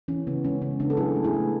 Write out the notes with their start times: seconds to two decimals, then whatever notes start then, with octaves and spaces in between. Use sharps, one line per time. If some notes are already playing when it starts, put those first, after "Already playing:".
0.08 E3 C#4
0.27 C#3 B3
0.44 G#3 C#4
0.62 C#3 C#4
0.80 C#3 B3 D4
0.90 A4
0.97 F#3 E4 G#4
1.16 A3
1.24 E4 G#4
1.34 A3